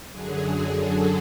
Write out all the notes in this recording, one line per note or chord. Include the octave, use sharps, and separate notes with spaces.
F#2 D3 F#3 G#4
G#4
A4